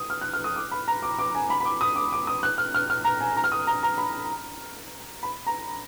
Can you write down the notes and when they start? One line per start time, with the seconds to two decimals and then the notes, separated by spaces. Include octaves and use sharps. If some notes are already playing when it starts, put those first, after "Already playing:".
Already playing: D#6
0.10 F6
0.21 F#6
0.33 F6
0.44 D#6
0.56 D6
0.71 B5
0.88 A#5
1.03 D6
1.19 D6
1.35 G#5
1.50 B5
1.60 B5
1.65 D6
1.81 D#6
1.96 D6
2.13 D6
2.27 D#6
2.43 F#6
2.58 F6
2.75 F6
2.90 F6
3.05 A#5
3.21 G#5
3.37 A#5
3.44 F6
3.52 D#6
3.67 A#5
3.83 A#5
3.98 B5
5.23 B5
5.47 A#5